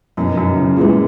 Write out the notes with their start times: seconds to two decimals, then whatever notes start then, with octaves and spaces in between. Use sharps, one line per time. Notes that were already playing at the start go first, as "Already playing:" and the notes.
0.17 F#2 B2 A#3 D#4
0.37 F#2
0.56 C#3
0.76 A#2 G#3 B3 E4 G#4